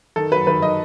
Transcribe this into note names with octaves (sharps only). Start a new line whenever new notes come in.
D#3 A4
F#3 B4
D#3 B4
D#3 D#5